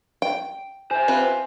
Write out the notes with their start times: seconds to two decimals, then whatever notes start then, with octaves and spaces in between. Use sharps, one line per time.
0.22 G5
0.91 C5 E5 G#5
1.08 C4 F4 B4